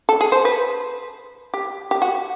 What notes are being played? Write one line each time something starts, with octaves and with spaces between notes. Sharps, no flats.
A4
G#4
C5
B4
G4
G4
F#4